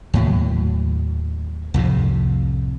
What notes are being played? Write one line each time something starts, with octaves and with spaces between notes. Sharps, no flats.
D#2 A2 F#3
C2 F2 A2 C3